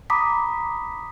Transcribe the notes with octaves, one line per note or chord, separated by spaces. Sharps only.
A#5 B5 D6 D#6 B6